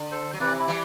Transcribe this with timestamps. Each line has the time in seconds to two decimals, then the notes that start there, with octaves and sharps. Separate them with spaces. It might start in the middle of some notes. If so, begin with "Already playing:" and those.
Already playing: D3
0.12 A4 C5
0.33 F#3
0.40 C3 E3 B4 D5
0.58 E4
0.67 E3 G3